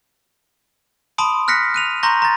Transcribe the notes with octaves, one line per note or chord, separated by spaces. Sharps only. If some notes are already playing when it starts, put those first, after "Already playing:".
A5 B5 C6 D#6 D7
F6 F#6 A#6 B6 C#7
F#6 D#7 F7
A#5 C6 C#6 G6 A#6
A#5 A6